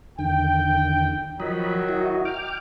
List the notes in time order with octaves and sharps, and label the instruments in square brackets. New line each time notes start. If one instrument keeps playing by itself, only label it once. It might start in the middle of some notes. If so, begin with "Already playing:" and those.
[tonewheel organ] E2 D3 D#3 [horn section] G5
[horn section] D#3 F#3 [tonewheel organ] F3 D#5 B5
[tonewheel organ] E4 F#4 D#5
G5 D6 F6